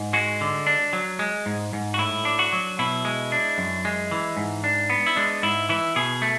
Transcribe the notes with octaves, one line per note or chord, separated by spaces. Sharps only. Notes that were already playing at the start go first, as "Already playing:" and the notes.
Already playing: G#2
G#3 F#4
D3
D4
F#3
G#3
G#2
G#2
F#4
A2 E4
D4
F#4
F#3
B2 E4
G#3
D4
F#2
G#3
E3
G#2
D4
B3
E4
G#3 D4
G#2 E4
E3 E4
B2 G#4
A3